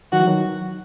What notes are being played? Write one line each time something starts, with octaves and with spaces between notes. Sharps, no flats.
D#3 F#3 F#4
E3
D#3 F#3